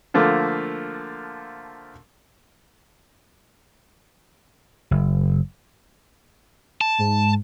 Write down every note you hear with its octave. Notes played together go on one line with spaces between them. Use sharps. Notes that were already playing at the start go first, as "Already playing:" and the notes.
D3 F3 A3 A#3
F#1
A5
G#2